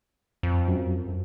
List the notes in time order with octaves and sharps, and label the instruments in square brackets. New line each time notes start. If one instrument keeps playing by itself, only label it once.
[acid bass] F2
[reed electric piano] F#2